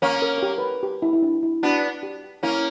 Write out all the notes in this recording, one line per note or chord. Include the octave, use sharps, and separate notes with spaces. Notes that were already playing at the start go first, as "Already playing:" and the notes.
A#3 C#4 C#5
A#4
A#4
G4
B4
A#4
G4
E4
E4
D4
E4
B3 D4 F#4
G4
A#3 C#4 E4